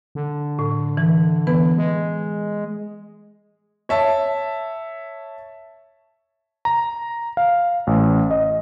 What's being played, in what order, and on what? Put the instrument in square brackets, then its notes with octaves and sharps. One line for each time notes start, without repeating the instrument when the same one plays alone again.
[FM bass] D3
[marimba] A2
E3
E3 B3 B4
[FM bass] G#3
[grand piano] C#5 E5 A5
[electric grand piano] A#5
F5
A1
D#5